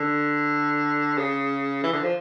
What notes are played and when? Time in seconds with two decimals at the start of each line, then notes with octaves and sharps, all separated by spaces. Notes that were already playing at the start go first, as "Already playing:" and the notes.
Already playing: D3
1.18 C#3
1.84 E3
1.92 D3
2.02 F3